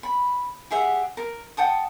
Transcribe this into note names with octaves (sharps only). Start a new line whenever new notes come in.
B5
G4 G#4 E5 F#5
A#4
F#5 G5 A5 D#6